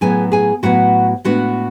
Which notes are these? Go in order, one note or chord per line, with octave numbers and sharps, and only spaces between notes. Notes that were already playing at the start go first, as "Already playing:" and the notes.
A2 F#3 B3 G#4 G#5
G#4 G#5
A2 F#3 B3 F#4 F#5
A2 G#3 B3 D4 F#4 F#5